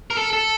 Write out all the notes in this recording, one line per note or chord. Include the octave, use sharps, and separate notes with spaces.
A#4
A4
A4